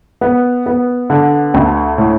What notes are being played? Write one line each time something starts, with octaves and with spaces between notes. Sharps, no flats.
B3
B3
D3
D2
A2